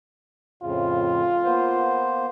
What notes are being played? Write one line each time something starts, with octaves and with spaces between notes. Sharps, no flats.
F2 A2 C#3 F4
A#3 B3 C5